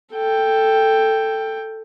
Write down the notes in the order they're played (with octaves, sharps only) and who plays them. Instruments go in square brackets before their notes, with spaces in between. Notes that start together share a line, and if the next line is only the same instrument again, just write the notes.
[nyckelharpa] A4 G5